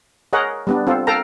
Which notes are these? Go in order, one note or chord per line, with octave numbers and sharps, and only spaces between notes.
G#4 A#4 C#5 D#5 F#5
G3 B3 D4
C4 F4 A4
A4 A#4 F5 G5 A5 A#5